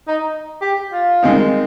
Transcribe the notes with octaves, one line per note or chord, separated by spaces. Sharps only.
D#4
G4
F4
D#3 G#3 C4 D#4